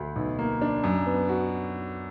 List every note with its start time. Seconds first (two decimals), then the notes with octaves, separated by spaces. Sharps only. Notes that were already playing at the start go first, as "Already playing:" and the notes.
Already playing: D2
0.16 B1
0.39 A#3
0.62 D4
0.84 F#2
1.06 B3
1.29 F#4